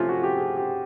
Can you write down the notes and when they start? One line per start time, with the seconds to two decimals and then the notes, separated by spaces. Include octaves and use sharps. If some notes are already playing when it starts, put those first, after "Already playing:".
Already playing: C3 F3 A3 C#4 F4
0.09 F#4
0.23 G4
0.38 G#4
0.57 G4